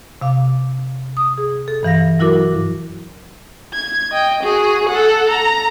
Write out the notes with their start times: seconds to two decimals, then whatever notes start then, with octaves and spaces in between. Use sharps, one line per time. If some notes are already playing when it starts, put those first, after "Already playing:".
0.21 C3 F5 D6
1.17 D#6
1.38 G#4
1.68 A4
1.83 G2 E3 F5 A#6
2.19 F#3 E4 F#4 A#4 D6
3.74 G#6
4.12 D#5 G5
4.43 F#4 G#4
4.89 A4 F#5
5.30 A#5